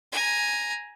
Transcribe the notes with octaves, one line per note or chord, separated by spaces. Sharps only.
G#5 A#5